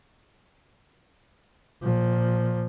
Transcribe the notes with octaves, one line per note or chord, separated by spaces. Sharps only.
A#2 F3